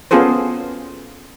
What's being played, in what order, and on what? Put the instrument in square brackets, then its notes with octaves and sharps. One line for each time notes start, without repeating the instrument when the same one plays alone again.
[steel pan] B3 C#4 F4 G#4 A4 C5